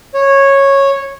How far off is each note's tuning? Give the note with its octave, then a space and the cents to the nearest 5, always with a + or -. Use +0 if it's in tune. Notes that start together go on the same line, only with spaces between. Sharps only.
C#5 -10